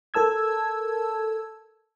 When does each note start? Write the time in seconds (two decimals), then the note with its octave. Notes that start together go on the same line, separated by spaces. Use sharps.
0.14 A4 A#4 A5 E6 G#6